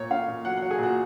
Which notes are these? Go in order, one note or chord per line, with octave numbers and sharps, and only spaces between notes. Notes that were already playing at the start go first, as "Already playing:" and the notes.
Already playing: A#2 C#5
C#4 F5
A#2
F#3 F#5
F#3 F#5
G#4
A#2 F#4